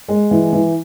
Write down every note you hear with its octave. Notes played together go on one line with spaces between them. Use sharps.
G#3
E3
E3